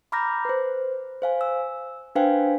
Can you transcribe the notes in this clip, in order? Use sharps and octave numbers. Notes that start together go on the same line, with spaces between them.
A#5 B5 D6 F6 G6 A#6
B4 C5
C5 F5 G#5
E6
D4 B4 C5 F5 G5 G#5